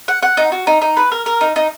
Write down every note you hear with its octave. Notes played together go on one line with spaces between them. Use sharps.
F#5
F#5
D#4
F#4
D#4
D#4
B4
A#4
A#4
D#4
D#4